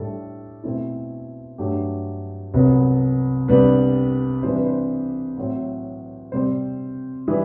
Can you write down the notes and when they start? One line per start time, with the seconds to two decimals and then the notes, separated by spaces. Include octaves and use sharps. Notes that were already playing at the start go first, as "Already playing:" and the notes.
Already playing: A2 G3 D4 A4
0.64 B2 A3 C4 E4
1.58 G2 F#3 A3 G4
2.54 C2 C3 F#3 B3
3.48 C2 C3 G3 B3 D4 B4
4.43 C3 E3 G3 D4 C5
4.55 B4
4.66 C5
5.37 A2 F#3 C4
6.32 C3 G3 C4 C5
7.27 E3 G3 B4